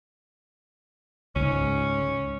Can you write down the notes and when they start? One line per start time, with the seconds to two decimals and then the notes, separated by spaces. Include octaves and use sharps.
1.36 C#2 G#2 C#4